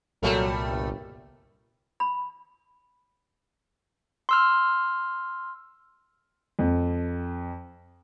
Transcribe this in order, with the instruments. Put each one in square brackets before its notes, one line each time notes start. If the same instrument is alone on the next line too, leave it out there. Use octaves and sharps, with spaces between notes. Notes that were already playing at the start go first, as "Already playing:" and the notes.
[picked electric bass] C2 A#2 [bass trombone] F#3 [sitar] G3 A3 A#4
[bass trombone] G1
[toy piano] B5
[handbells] C6 E6 F6
[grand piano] F2